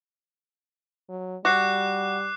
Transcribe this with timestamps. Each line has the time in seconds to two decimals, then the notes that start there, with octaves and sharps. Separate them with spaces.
1.09 F#3
1.45 G3 F#4 D6 F#6 C7